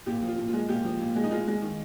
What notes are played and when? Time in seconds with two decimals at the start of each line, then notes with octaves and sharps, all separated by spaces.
0.06 A#2 G4
0.22 F3
0.28 F4
0.38 A#2
0.48 F4
0.53 G#3
0.69 A#2 G4
0.85 F3
1.00 A#2
1.16 G#3
1.24 D#4
1.31 G#3 F4
1.47 G#3
1.62 D#3